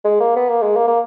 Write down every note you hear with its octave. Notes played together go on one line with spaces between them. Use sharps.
G#3
A#3
B3
A#3
G#3
A#3
A#3